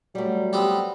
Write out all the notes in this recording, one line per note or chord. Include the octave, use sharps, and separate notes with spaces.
F#3 G3 A3
B3 C4 G4